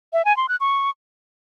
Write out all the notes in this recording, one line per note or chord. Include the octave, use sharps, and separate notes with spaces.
E5
G#5
C6
F#6
C#6